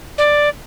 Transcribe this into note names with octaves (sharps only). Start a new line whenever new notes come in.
D5